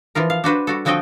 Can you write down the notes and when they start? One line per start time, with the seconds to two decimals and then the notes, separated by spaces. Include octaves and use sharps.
0.15 E3 F3 F4 A#4
0.30 F5
0.44 D4 F#4 B4 C5
0.67 G3 F#4 A4
0.85 D3 F3 C4 F#4 D#5 G5